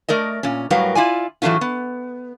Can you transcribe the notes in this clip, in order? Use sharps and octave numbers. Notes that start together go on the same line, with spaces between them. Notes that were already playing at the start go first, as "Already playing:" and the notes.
A3 A#4 D5 D#5
A#2 C#4
A2 F#3 G3 A#4 B4 F5
E4 F4 D5 G#5
A2 E3 F#3 A3 C#4 F4
B3